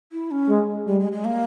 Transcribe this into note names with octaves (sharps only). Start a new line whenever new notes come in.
E4
C#4
G#3
G3 G#3
G#3
G#3
A#3